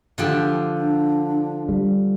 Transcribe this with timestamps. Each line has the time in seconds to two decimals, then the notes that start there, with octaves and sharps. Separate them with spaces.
0.18 D3 F3 G4
0.77 D4
1.69 G3